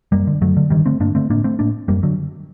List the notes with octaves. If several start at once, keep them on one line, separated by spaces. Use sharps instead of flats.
F#2 G3 A#3
D3
F#2 F#3 A3
D3
G2 D#3 G3
D3 A3 C4
G2 A#3 D4
D3 A3 C4
A2 A#3 D4
A3 C4
A2 A#3 D4
F#2 G3 A#3
D3 F#3